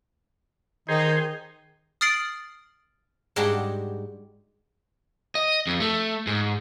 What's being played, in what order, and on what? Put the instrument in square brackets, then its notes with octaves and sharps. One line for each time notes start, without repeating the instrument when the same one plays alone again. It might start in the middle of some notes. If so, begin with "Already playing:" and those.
[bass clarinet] D#3 [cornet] D#4 [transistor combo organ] G#4 C5
[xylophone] D#6 F6 A6 C7 D7 F#7
[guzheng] G#2 G3 G#3 D4 F#4 G4
[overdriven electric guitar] D#5
F2
A3
G#2